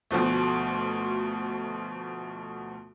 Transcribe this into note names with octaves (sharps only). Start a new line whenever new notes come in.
D2 B2 F3 A3